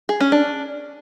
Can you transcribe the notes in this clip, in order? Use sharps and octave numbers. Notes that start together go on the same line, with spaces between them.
G#4
C#4
D4